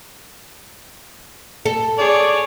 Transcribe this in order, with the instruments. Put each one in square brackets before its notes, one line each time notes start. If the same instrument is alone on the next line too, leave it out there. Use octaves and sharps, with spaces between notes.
[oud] A4
[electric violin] G#4 C#5 [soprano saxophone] D5